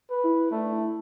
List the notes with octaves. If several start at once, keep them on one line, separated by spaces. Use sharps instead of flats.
B4
E4
A3 D4
E4